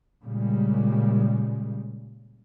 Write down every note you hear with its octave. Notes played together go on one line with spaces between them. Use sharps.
A#2 C#3 G3 G#3